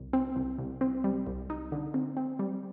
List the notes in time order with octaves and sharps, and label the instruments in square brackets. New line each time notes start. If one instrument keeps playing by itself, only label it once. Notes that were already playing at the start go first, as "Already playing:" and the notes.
Already playing: [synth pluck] C2
C4
C2
C2
C4
G3
C2
D#4
D3
C4
C4
G3